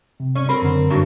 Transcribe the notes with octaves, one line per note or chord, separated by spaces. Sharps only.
C3
C#4
C4 A#4 B5
F#2 D3
G2 F#3